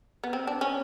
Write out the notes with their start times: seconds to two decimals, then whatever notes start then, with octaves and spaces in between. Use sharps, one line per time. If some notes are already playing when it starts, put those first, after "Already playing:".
0.24 B3
0.33 C4
0.47 D4
0.61 C#4